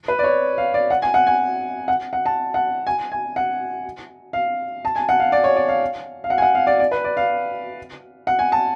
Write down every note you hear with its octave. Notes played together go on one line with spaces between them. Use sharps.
B4
D5
C#5
F5
D5
F#5
G#5
F#5
G#5
F#5
F#5
A5
F#5
G#5
G#5
F#5
F5
A5
G#5
F#5
F5
D5
C#5
D5
F5
F5
F#5
G#5
F#5
F5
D5
D5
B4
D5
F5
F#5
G#5
A5